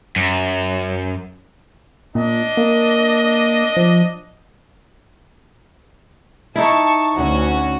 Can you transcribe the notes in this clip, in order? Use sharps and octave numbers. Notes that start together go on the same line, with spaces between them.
F#2
A#2 D4 D#5
A#3
F3
D#4 E4 A5 C#6
D2 C#4 F#4